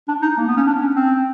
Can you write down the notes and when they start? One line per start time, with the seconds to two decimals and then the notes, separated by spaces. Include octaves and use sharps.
0.08 D4
0.22 D#4
0.38 A#3
0.47 B3
0.56 C#4
0.67 D4
0.81 C#4
0.95 C4